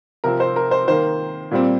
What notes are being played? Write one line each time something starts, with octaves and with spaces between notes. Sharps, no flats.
C3 F3 C4 A#4
C5
A#4
C5
D#3 A#3 C5
A#2 G3 C4